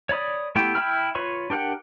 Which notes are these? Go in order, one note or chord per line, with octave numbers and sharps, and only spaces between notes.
C#5 D5 B5 D#6
A3 B3 E4 G4 G5
E4 E5 G5 B5 F6
F4 B4 C#5 B5 C#6
D4 G4 A#4 F#5 G5